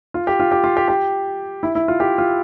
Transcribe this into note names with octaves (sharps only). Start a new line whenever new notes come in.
F4
G4
F4
G4
F4
G4
G4
E4
E4
F4
G4
F4